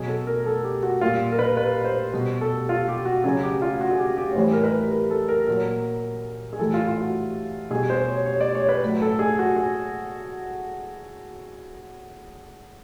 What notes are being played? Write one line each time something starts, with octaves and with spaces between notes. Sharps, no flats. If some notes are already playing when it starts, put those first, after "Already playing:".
Already playing: B2 F#3 G#4
A4
A#4
A4
G4
F#4
A#2 G3 F4
A#4
B4
B4
C5
B2 G3
A4
F4
G4
F#4
C#3 F#3 G#4
G4
F4
F#4
G#4
G4
G4
C#5
A2 E3 G3 C5
A#4
B4
A#4
A4
A#4
A#2 F#3 A#4
G#4
A2 E3 G3 A4
F4
F4
F#4
B2 G3 G#4
C5
C#5
C#5
D5
C#5
B4
A2 F#3
A4
G#4
F#4
G#4